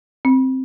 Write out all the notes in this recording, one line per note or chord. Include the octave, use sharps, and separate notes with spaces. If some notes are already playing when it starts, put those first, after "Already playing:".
C4